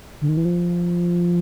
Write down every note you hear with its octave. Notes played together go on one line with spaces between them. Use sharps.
D3
D#3
E3
F3